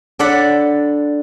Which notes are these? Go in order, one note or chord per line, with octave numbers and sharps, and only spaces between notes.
D4 A4 D5 F#5 B5